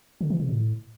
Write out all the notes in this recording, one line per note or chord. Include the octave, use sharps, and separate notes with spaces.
D3
E3
C3
A2